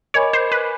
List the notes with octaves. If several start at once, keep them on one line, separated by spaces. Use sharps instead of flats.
A#4 C#5 D#5 G#5 B5 D6
C5
B4